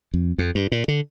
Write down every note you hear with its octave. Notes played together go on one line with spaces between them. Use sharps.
F2
F2
G2
A#2
D3